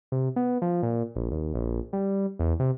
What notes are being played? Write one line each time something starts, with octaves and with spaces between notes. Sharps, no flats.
C3
B3
F3
A#2
A#1
D#2
A#1
G3
E2
C3